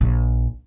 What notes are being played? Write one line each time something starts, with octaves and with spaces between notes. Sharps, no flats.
A#1